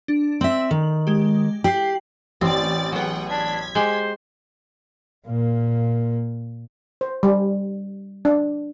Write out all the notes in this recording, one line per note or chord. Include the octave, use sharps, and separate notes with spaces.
D4
C4 E5 F#7
D#3
G#3 G4
G4 C7 F#7
A1 C4 D5 A6
F#3 B3 G#4 F#5 G5
D4 G#6 B6
G#3 G4 C5
A#2 A#3
C5
G3
D4